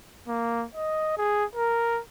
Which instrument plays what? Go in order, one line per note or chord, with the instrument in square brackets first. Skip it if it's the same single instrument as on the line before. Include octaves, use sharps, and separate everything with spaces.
[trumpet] A#3
D#5
G#4
A#4